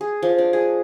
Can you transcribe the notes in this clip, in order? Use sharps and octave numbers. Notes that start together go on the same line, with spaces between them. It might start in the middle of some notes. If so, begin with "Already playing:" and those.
G#4
F3
D4
G#4